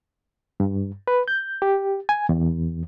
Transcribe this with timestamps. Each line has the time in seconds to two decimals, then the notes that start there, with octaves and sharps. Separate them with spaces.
0.60 G2
1.08 B4
1.28 G6
1.62 G4
2.09 G#5
2.29 E2